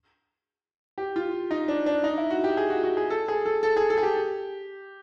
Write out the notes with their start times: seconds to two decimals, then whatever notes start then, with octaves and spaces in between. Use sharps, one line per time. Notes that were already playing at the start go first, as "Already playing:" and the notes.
0.98 G4
1.16 F4
1.51 D#4
1.68 D4
1.86 D4
2.04 D#4
2.18 E4
2.30 F#4
2.44 G4
2.57 G#4
2.70 F#4
2.84 F#4
2.97 G#4
3.10 A4
3.28 G#4
3.46 A4
3.63 A4
3.77 G#4
3.90 A4
3.98 G#4
4.03 G4